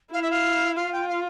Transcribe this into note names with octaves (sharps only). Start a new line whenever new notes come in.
E4 F5
E5
F5
F4 F5
G5
F5